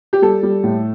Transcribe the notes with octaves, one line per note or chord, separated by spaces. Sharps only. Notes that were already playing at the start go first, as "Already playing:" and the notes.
G4
G3 A4
G3
A2